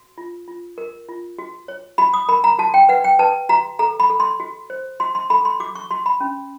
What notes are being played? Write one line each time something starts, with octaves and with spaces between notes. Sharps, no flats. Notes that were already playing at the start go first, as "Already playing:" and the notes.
Already playing: F#4
F4
F4
A#4
F4
F#4
C#5
F#4 B5
D#6
A#4 B5
A#5
F#4 A5
G5
B4 F#5
G5
B4 A5
F#4 A#5
A4 A#5
B5
A4
C6
F#4
C5
F#4 C6
C6
A4 B5
C6
F#4 D6
C#6
F#4 C6
B5
C#4